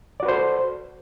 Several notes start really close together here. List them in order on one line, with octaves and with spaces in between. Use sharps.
D5 F#4 B4 C5 A4